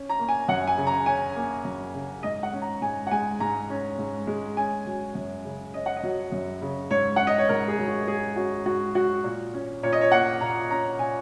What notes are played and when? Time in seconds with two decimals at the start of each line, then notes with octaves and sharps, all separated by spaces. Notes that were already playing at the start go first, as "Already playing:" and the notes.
Already playing: C#4
0.10 A#5
0.19 A#3
0.29 G#5
0.48 F#2 F#5
0.67 G#5
0.77 C#3
0.87 A#5
1.06 C#4 G#5
1.36 A#3
1.65 F#2
1.94 C#3
2.23 G#2 D#5
2.43 F#5
2.53 C#4
2.62 A#5
2.81 G#2 G#5
3.07 F#5
3.11 G#3 G#5
3.40 G#2 A#5
3.70 C#4
3.98 G#2
4.27 G#3
4.57 C#4 G#5
4.86 F#3
5.15 F#2
5.45 C#3
5.74 C#4 D#5
5.86 F#5
5.96 D#5
6.03 F#3
6.32 F#2
6.62 C#3
6.91 G#2 C#5
7.16 C#4 F#5
7.27 D#5
7.38 C#5
7.49 G#2 A#4
7.68 G#4
7.78 F#3
7.88 F#4
8.08 G#2 G#4
8.36 C#4 F#4
8.65 G#2 F#4
8.95 F#3 F#4
9.24 A#2
9.54 C#4
9.83 A#2 C#5
9.92 D#5
10.01 C#5
10.12 A#3 F#5
10.41 A#2 A#5
10.70 C#4 A#5
10.99 A#2 G#5